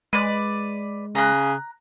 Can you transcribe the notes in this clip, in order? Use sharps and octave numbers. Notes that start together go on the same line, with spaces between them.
G#3 B4 D5
C#3 A#5 F#6